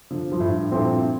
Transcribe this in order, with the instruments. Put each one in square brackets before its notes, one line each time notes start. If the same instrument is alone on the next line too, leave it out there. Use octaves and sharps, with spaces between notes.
[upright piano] D3 F3
[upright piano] G2 [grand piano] F3
[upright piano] A2
G2
[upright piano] G2 A#2 [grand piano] C4 E4 A4